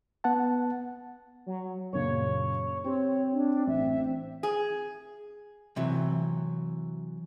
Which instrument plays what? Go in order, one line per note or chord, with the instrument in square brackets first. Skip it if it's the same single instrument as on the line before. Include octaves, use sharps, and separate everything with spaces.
[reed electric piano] B3 F#5 A5
[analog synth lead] F#3
[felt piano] F#2 A#2 C#3 [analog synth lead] C#5
[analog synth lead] C4 [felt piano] G4 [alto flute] C#5
[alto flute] D4
[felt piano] A1 [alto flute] E5
[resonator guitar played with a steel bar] G#4
[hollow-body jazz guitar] C3 E3 F#3